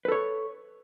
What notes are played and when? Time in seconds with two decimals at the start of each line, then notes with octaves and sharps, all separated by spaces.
0.05 B4
0.08 A4
0.12 C#5